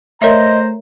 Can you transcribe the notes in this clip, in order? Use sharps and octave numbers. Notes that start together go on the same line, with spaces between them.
A3 A#4 C5 C#5 D#5 E5 A#5